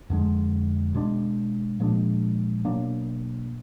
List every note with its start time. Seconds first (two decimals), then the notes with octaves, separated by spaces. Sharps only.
0.10 F2 D3 G#3
0.94 B2 G#3 D4
1.80 A#2 F3 G#3 D4
2.65 B2 F#3 A#3 D4